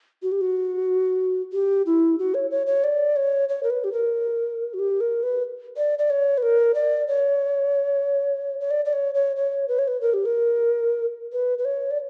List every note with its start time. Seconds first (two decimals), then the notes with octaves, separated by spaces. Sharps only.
0.23 F#4
0.32 G4
0.41 F#4
1.53 G4
1.86 E4
2.19 F#4
2.34 C#5
2.51 C#5
2.67 C#5
2.84 D5
3.16 C#5
3.49 C#5
3.63 A#4
3.70 B4
3.84 G4
3.93 A#4
4.74 F#4
4.79 G4
5.00 A#4
5.23 B4
5.77 D5
5.99 D5
6.10 C#5
6.38 B4
6.42 A#4
6.74 D5
7.08 C#5
8.60 C#5
8.71 D5
8.85 D5
8.93 C#5
9.14 C#5
9.36 C#5
9.68 B4
9.79 C#5
9.88 B4
10.01 A#4
10.13 G4
10.25 A#4
11.32 B4
11.58 B4
11.65 C#5
11.91 D5